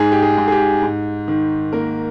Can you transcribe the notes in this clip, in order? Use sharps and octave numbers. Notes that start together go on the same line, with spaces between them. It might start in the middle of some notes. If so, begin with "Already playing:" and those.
Already playing: G#2 G#4
G4
G#4
G#2
G#4
G4
G#2
D#3
A#3 A#4